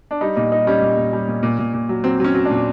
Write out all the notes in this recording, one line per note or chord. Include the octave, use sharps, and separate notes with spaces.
D4
G3 D#4
A#2 D#4
G3 D#4
G3 C#4
A#2
A#2
G3
A#2
A#2
A#2
A#2
F#3
F#3 C4
F#3 C#4
F#3
D4
A#2